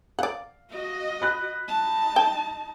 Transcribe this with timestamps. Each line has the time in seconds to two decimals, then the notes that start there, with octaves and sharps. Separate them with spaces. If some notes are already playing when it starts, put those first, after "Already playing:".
0.19 D5 F5 F#5
0.70 F#4 D#5
1.22 B5 F#6
1.67 D#4 A5
2.16 G5